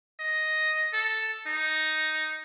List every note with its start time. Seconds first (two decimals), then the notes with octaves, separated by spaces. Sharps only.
0.20 D#5
0.93 A4
1.47 D#4